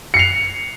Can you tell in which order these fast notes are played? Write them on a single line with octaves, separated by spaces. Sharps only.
C#7 C7 F7